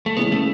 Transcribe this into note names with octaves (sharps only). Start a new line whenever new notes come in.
A3
C#3 E3 G#3 B3 C#4
A3